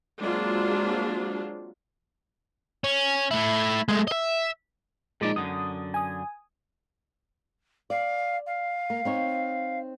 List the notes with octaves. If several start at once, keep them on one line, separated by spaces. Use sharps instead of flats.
F#3 G#3 A#3 C4 D4 F4
C#4
A3 E4
G#3 A3
D#5 E5
A#2 F3 G#3 D#4 D5
F#2 D3 D#6
G#5 D#6
D5 F5
F5
A#3
C4 D#4 C#5